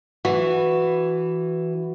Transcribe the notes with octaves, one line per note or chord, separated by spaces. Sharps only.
E3 F#4